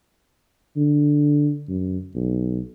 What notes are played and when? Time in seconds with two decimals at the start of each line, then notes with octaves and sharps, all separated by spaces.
0.77 D3
1.69 F#2
2.15 B1